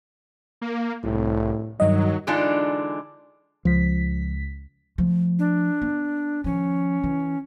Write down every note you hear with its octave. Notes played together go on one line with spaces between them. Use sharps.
A#3
C2 A2
G2 D#3 F#3 D#5
D3 E3 G#3 D4 D#4 F4
C#2 F3 B6
F3 A3
D4
B3
D#3 F3 C#4
E3